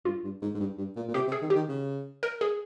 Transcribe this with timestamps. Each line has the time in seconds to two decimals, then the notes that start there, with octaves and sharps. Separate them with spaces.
0.05 G2 F4
0.24 G2
0.42 G#2
0.54 G#2
0.60 G2
0.78 G2
0.96 A#2
1.08 A#2
1.14 C3 G4
1.27 C3
1.32 G#4
1.41 D#3
1.50 G4
1.55 D#3
1.69 C#3
2.23 A#4
2.41 G#4